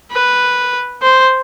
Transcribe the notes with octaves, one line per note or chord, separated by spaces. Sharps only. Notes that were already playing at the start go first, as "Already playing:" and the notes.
B4
C5